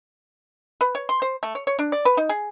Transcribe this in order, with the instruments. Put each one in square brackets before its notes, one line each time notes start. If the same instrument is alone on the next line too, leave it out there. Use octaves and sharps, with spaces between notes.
[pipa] B4
C#5
C6
C5
A3
C#5
C#5
D4
D5
B4
D#4
G#4